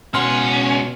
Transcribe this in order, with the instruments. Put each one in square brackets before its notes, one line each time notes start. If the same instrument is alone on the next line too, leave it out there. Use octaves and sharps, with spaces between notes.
[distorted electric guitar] C#2 F#5 [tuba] B2 [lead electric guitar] C#4 [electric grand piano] C6 F6